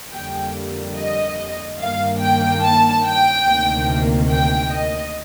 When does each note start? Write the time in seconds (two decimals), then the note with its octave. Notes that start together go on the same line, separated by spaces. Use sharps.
0.12 F2 D3 G3 A#3 G5
0.96 D#5
1.79 G2 D#3 A#3 F5
2.21 G5
2.63 A5
3.05 G5
3.47 D2 C3 D#3 A#3
4.31 G5
4.73 D#5